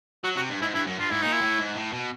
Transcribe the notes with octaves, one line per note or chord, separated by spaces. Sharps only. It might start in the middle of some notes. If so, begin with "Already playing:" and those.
F#3 F#4
C3 F#4
G2
G#2 E4
G2 E4
F#2
G2 F4
G#2 E4
A#2 D#4
E4
A2
G#2
A2
B2